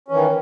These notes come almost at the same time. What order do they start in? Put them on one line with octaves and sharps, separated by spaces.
C#4 E3 D#3